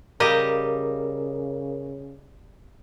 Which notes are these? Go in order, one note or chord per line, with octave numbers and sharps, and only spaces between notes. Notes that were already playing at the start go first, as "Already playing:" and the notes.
C#3 G3 G4 A#4 D#5 F5